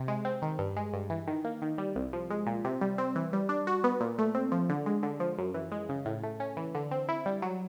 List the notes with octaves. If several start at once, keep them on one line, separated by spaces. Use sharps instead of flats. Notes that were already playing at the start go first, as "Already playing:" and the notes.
Already playing: C3
G#3
C4
D#3
G2
G#3
G2
E3
D#3
A#3
D#3
G3
C2
F3
G#3
A#2
C3
G3
C4
E3
G3
D4
F#4
B3
A#2
A3
C4
F3
D3
G#3
D3
F3
F#2
E3
G#3
C#3
A2
A3
C#4
E3
D3
C4
E4
G3
F#3